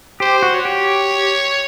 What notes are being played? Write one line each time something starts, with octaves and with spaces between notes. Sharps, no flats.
G4 C5
F#4
C#5
G4